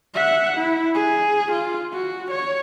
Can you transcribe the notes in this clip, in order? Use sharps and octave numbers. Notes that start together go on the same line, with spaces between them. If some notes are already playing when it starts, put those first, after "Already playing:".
E5 F#5
E4
G#4
F4
F#4
C#5